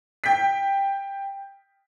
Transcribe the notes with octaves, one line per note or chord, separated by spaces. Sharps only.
G5 B6